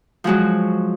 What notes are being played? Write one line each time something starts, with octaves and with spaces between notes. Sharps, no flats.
F3 F#3 G#3 F#4